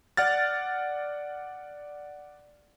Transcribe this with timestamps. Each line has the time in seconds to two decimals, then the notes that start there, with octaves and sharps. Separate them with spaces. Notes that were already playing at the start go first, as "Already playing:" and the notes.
0.17 D5 F#5 F6 A6